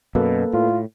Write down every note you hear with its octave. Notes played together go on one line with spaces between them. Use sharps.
F#2 B2 A#3 A4 B4
A2 F4